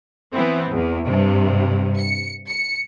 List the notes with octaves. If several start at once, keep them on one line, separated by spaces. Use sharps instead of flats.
E3 B3 C4
E2
G2 C3
C#7
C#7